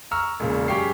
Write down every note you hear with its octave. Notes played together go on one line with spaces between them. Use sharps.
A#5 C#6 E6 F6
E1 A#2 C#3
F#2 G4 G#4 G5 C#6 C7